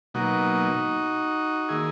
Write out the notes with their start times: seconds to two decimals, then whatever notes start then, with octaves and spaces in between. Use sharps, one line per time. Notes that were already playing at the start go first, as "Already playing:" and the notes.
0.14 B2 F#3 A#3 D#4 F#4
1.68 D#3 A#3 E4 G#4